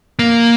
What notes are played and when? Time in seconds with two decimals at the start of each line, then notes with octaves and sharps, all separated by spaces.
0.19 A#3